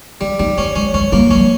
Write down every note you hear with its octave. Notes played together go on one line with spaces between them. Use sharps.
G3 D4
G3 D#4
A3 C#4
G#3 C#4
G#3 C#4
G3 A#3
F#3 C#4